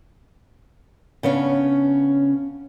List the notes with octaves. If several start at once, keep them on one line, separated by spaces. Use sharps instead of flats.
C#3 B3 C#4 D4